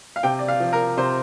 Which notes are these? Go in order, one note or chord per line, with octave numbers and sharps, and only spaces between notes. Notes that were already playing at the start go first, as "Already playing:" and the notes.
F5
C3 G5
D5
F5
F3
A#4
C3 C5